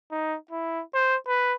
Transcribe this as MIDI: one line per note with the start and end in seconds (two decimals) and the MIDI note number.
0.11 0.36 63
0.51 0.82 64
0.94 1.16 72
1.27 1.54 71